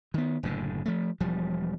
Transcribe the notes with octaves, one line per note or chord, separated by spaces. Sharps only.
D#3 B3
F#1 A2 D3
F3 A3
E1 F3 G3